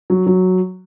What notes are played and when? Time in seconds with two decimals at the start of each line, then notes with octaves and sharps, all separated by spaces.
0.10 F#3
0.26 F#3